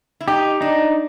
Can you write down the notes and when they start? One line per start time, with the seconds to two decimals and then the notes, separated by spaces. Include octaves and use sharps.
0.21 E4
0.28 D#4 G4
0.61 D4 D#4